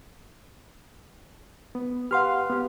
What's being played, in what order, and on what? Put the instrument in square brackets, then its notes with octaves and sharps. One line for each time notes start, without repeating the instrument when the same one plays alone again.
[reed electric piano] B3
[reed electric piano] G4 B4 F5 [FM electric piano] F#5 C6 F6
[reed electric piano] B3 G4